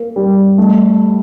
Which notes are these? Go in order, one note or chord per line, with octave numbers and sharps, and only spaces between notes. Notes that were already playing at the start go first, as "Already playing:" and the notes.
Already playing: A#3
G3
A3